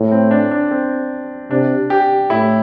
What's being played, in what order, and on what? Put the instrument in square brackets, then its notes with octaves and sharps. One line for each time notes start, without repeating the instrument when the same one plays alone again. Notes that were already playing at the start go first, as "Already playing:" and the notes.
Already playing: [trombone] A2
[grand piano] C4
D4
D4
C4
[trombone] C3 [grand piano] D4
[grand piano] G4
[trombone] A2 [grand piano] E4